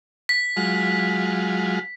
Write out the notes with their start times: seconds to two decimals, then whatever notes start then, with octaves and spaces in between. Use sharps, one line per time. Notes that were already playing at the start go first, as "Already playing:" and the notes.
0.29 B6
0.57 F#3 G#3 F4